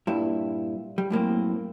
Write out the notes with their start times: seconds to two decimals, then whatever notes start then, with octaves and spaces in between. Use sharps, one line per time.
0.07 G2 A#2 E4
0.98 G3
1.10 F#2 A2 A#3 C4